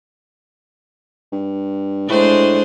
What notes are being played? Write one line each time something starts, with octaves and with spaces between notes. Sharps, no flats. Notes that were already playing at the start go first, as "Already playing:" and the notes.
G2
A2 G#3 D4 C5